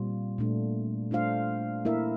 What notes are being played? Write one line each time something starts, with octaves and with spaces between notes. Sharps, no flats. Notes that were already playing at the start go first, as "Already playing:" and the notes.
Already playing: A#2 G3 C4 F4
A#2 A3 D4
A3 D4 F4 C5 F5
A#3 E4 A#4 E5